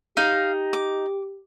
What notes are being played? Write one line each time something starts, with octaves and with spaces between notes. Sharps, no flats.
D#4 G4 F5
D6